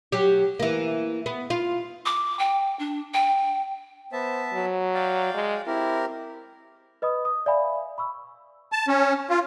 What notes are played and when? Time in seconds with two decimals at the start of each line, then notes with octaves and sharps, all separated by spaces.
0.12 F#3 G4
0.60 E3 A#3
1.26 B3
1.50 F4
2.06 D6
2.39 G5
2.79 D4
3.14 G5
4.12 B3 C5 E5 A5
4.53 F#3
4.94 D5 F5 G5
5.34 G#3
5.67 C4 E4 G4 A#4
7.02 B4 D#5 B5 D#6
7.25 D#6
7.46 D5 E5 F5 G#5 B5
7.98 B5 C#6 E6
8.72 A5
8.88 C#4
9.30 F4